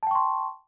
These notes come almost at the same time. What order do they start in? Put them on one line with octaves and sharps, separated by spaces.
A5 G5 C#6 C6